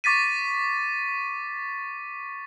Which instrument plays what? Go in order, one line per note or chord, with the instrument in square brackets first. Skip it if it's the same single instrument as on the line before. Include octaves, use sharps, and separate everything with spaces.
[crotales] C#6 D6 A6 B6 D#7